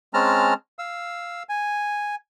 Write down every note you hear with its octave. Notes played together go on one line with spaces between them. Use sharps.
G#3 C4 C#4 A5 A#5 F6
F5 E6
G#5